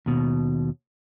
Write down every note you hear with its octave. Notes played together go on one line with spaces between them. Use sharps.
D#2 B2